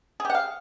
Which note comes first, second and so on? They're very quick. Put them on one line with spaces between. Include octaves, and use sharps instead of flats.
G#4 G4 F#5 F5